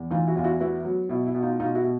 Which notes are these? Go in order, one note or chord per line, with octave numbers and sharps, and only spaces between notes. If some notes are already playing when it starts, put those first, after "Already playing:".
Already playing: E2
E3 D#4 F4
E4 F#4
E2 F4
E4 F#4
B3 E4 F#4
F#3
B2 E4
E4
B2
D#4 F4
B2 D#4 F4
E4 F#4
B2